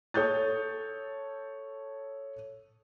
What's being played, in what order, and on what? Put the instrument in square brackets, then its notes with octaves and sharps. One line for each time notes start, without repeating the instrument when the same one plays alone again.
[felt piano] A4 C#5 D#6 G6 A6